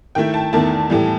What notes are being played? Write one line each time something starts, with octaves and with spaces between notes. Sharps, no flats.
D#3 A3 E4 G5
A5
E2 D#3 A3 E4 A5
A2 E3 G3